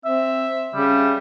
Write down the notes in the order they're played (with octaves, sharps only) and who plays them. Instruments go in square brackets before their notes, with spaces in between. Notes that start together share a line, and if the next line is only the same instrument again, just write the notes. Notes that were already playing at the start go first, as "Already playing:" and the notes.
[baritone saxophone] C4 [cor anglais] E5
[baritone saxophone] C#3 [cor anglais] G3